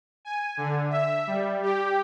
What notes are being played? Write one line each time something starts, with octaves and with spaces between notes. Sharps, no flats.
G#5
D3
E5
G3
G4